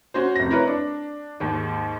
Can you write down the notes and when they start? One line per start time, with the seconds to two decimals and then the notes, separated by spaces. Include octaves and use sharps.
0.14 C#4 F#4 C5
0.36 F1 A#6
0.50 E4 A#4 B4 C#5
0.67 D4
1.40 D#2 G#2 D#3